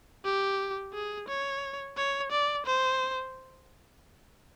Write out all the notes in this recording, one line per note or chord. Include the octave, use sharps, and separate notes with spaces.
G4
G#4
C#5
C#5
D5
C5